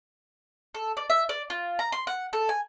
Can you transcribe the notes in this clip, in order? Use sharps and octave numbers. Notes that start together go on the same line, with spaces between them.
A4
D5
E5
D5
F4
A#5
C6
F#5
A4
G#5